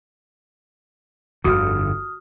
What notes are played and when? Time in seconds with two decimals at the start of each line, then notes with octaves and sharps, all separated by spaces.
1.44 G1 F2 D3 F#4 D#6 F6